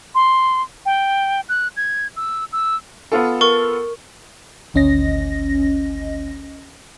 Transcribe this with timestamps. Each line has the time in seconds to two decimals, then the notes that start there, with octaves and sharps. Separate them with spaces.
0.15 C6
0.86 G5
1.49 F#6
1.77 G#6
2.16 E6
2.53 E6
3.12 B3 F4 A4
3.41 A#4 C#6
4.74 G#1 D2 C#4 D#5 A#6